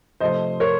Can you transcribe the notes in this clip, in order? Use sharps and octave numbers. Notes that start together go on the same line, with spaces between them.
C3 F3 A3 C5 D#5
A#4 C#5